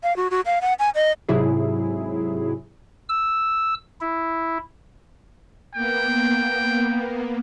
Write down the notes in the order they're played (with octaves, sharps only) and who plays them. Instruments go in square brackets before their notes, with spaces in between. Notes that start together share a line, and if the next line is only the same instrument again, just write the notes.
[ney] F5
F#4
F#4
F5
F#5
G#5
D#5
[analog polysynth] G#2 C3 F#3 E4 G#4
[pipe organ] E6
E4
[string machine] A#3 B3 [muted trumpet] G5